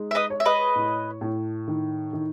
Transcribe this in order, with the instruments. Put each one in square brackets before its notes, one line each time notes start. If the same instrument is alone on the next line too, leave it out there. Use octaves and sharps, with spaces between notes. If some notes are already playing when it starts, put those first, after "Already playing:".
Already playing: [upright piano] G#3 D#4
[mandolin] E5
B4 D#5
[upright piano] C#5
[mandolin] E5
B4 D#5
[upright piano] A2
A2
D#3
D#3